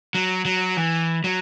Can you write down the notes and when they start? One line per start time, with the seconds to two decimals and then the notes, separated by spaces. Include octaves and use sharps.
0.15 F#3
0.45 F#3
0.77 E3
1.24 F#3